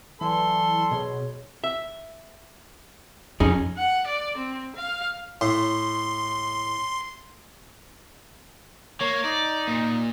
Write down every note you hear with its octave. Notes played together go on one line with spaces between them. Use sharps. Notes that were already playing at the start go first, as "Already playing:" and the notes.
E3 F#3 A4 D5 C6
B2 G#4 C#5
E5
F2 C#4 D#4 G#4
F#5
D5
C4
F5
A2 C6
A#3 C#5
D#4 D5
A#2